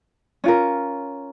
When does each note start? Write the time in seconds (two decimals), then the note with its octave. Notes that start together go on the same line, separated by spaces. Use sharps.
0.44 C#4 F4 A#4